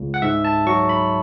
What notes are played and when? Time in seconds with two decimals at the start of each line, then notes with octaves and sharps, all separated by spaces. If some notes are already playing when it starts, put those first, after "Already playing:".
Already playing: C#2
0.14 F#5
0.22 G#2 E5
0.44 A5
0.66 F#3 C#6
0.89 B5